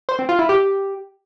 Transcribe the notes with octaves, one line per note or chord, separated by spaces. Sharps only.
C5
C4
F4
E4
G4